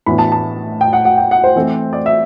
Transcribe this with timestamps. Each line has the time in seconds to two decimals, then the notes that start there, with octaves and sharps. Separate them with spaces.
0.06 A2 E3 B3 D4 B5
0.18 A5
0.32 A5
0.81 G5
0.93 F#5
1.05 F#5
1.18 G5
1.31 F#5
1.44 C5
1.56 E3 A3 C4
1.93 D5
2.06 E5